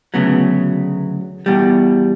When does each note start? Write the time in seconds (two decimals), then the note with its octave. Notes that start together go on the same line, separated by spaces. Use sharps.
0.14 D2 C#3 F#3 B3
1.46 E2 B2 G3